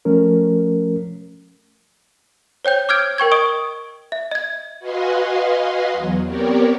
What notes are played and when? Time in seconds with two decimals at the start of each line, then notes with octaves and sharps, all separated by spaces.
0.05 F3 A3 C#4 A#4
2.65 C5 C#5 G5 G6
2.89 D6 E6 F6 G6 G#6 D7
3.18 A#4 G5 C#6 G#6
3.32 D#5 C#6 D#6 G#6 D7
4.12 E5
4.31 D#5 G#6
4.79 F#4 B4 D#5 F5 G#5 C6
5.93 E2 F#3
6.26 B3 C4 G4 A#4 C#5 D5